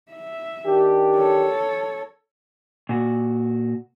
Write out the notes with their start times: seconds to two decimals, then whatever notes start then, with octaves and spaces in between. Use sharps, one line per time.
0.12 E5
0.66 D#3 D4 G4
1.16 A4 C#5
2.89 A#2 F#4